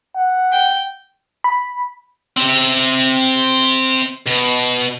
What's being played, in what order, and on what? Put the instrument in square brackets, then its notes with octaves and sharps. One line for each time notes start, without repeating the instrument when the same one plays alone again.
[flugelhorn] F#5
[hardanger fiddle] G5
[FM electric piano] B5
[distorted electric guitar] C4 E5
B2